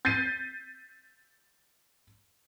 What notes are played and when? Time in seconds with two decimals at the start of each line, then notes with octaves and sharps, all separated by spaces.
0.05 G6 A6 B6 C7 D#7